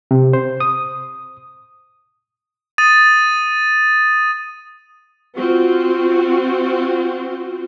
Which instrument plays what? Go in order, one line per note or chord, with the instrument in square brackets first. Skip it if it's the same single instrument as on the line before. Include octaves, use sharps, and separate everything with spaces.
[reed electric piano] C3
C5
D#6
[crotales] D#6 A6 D#7
[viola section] C4 F4 F#4